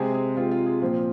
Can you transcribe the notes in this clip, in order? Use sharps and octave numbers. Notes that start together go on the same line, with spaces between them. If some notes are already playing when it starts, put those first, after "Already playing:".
Already playing: C3 G#3 C4 G#4
G#4
C3 G#3 C4 F4
F4
G#4
A#2 F3 C4 F4